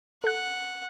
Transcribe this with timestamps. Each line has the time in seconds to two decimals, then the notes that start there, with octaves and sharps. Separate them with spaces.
0.24 A4 F#5 F#6